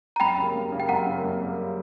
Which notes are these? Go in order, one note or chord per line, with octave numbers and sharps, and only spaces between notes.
A#5
F#2 G5 B5
C#3 G3 A#3
F#2
C#3 G3 A#3
G5
F#2 F#5 A#5
C#3 G3 A#3
F#2
C#3 G3 A#3